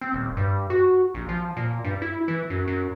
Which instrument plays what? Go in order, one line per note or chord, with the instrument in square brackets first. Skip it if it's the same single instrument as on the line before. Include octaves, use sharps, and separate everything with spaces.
[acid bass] C4
D#1
G2
F#4
A#1
F3
A#2
G2
E4
E3
F#2
F#2